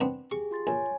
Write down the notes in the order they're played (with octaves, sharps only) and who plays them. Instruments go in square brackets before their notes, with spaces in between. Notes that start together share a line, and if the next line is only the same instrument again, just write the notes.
[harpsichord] B3 C4 D4
[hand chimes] G4 G#4 [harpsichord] C#6
[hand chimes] F4 C6 A6
[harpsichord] A#1 [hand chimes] C#5 G#5